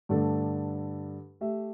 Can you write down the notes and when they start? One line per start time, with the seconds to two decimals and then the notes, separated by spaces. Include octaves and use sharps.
0.09 G2 D3 A3 D4 A4
1.41 A3 G4 E5